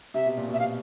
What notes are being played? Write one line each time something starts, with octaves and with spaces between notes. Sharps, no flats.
C3 E5
B2
A#2
B2
E5
C3 F5